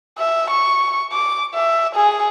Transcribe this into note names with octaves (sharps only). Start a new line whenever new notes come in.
E5
C#6
D6
E5
G#4